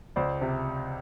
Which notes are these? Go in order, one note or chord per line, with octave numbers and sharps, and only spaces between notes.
C#2 C5 D5
C3